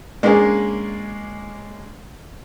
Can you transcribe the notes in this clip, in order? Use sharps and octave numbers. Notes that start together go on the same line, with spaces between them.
G#3 A#3 C#4 D4 G#4